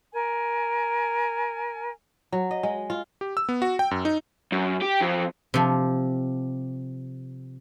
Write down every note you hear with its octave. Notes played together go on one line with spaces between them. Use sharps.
A#4 G#5
F#3
D#5
G#3
F4
G4
E6
B3
F#4
G5
F#2
D#4
F#2
G4
F2
C3 F3